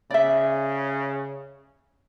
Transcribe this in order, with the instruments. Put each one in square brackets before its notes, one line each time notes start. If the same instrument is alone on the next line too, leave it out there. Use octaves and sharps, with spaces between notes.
[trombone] C#3 [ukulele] D5 E5